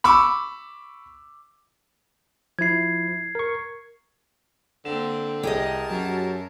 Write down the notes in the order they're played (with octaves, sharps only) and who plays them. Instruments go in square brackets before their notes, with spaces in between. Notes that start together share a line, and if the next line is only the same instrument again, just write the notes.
[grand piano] B5 C#6 D6 E6
[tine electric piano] F3 E4 [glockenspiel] G#6 C7
[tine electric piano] A#4 C#6
[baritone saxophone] D3 [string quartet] A#3 C4 [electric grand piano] E7
[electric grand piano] C2 [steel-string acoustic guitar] G4 G#4 D#5 [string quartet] A#4 A5
[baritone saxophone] F#2 [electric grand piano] F#3